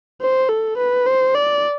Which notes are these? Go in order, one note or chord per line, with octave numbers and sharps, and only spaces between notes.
C5
A4
B4
C5
D5